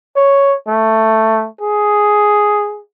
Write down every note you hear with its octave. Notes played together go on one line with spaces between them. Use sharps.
C#5
A3
G#4